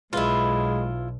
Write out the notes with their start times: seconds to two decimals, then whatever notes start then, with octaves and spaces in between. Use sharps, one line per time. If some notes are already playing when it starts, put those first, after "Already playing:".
0.13 B1 G#3 E4 F4 B4